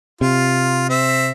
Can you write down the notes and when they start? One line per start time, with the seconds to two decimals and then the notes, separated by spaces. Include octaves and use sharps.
0.21 C3 F4
0.90 C4 E5